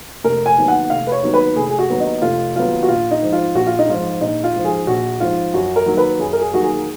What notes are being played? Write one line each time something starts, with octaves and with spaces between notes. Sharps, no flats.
F1 A#4
G#5
D#2 D#3 F#3 B3
F#5
F1 F5
B4
C#5
D#2 D#3 F#3 B3
B4
F1 G#4
G#4
F#4
D#2 D#3 F#3 B3
D#4
F1 F4
D#2 D#3 F#3 B3 F4
F#4
A#1 F4
D#4
G#2 F3
F4
A#1 F#4
F4
D#4
G#2 F3 F4
A#1 D#4
F4
G#2 F3
G#4
A#1 F#4
G#2 F3 F4
F#2 F#4
A#4
D#3 F#3 A#3
B4
F#2 G#4
A#4
G#4
D#3 F#3 A#3 F#4
G#4